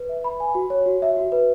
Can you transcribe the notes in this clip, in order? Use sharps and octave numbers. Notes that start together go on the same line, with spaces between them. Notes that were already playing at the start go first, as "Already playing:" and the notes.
Already playing: B4
E5
B5
G#5
F#4
C#5
F#4
E5
F#4
B4